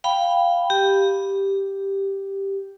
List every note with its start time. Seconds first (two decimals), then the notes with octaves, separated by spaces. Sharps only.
0.04 F5 G5 B5
0.70 G4